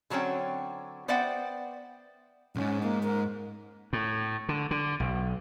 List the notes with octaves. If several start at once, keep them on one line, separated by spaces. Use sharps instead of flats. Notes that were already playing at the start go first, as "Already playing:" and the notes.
D3 F#3 C4 C#4 G5
B3 C5 D5 E5 F#5 G5
B1 G#2 C#4
A#3
A#4
A2
D3
D3
B1